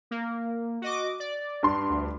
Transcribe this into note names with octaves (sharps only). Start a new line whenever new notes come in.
A#3
F#4 D#5 D6
D5
G2 C6
D2